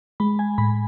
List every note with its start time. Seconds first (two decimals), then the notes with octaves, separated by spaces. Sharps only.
0.20 G#3 B5
0.39 G#5
0.58 A2 B5